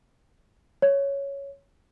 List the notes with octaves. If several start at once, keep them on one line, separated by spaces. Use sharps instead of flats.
C#5